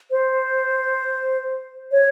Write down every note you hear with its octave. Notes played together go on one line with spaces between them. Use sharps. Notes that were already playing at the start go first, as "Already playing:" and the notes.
C5
C#5